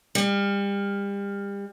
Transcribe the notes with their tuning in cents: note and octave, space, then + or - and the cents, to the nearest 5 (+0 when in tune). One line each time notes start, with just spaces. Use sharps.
G3 +35